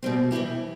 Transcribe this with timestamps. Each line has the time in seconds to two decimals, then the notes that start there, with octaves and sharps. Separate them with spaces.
0.02 B2 G3 C4
0.31 E3 G3 C4 E4 G4